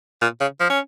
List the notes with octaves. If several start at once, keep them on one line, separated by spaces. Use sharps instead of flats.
A#2
C#3
F3
C#4